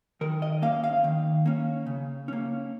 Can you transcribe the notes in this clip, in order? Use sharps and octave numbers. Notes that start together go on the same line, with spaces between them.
D#3 A#4
D#5
A#3 C#4 F5
F5
D#3
A#3 C#4
C#3
A#3 C#4